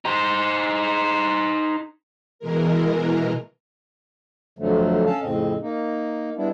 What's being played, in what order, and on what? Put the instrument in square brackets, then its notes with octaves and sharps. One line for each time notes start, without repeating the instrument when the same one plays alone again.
[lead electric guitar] D#4 C5
[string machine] B2 E3 G#3 A#4
[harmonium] F2 D3 F3 F#3 A3
C#4 A4 F5 A5
F2 A2 C#3 C4 D#5
A#3 D#4
G3 G#3 B3 D4 E4